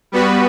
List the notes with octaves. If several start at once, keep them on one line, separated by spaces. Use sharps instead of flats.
G3 B3 F#4 B4